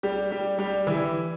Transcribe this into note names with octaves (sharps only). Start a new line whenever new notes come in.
G3 G4
G3 G4
G3 G4
E3 E4